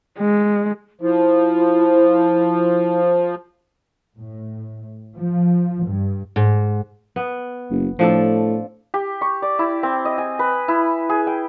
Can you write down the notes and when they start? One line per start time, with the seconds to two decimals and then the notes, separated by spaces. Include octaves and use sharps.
0.19 G#3
1.01 F3 E4
4.16 A2
5.16 F3
5.84 G2
6.36 G#2
7.16 B3
7.71 F#1
7.99 A2 F3 D4 A4
8.94 G4
9.21 C#6
9.42 D5
9.59 E4
9.83 C4
10.05 D#5
10.18 G#5
10.39 B4
10.68 E4
11.09 G#4
11.27 G5